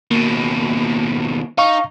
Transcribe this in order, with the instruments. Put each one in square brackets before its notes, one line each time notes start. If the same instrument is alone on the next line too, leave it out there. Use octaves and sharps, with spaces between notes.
[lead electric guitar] D#2 B2 [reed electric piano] A#3
[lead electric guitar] D#4 [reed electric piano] F5 C#6